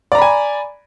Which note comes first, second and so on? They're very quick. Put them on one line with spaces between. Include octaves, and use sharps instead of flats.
D5 A#5 B5 G#5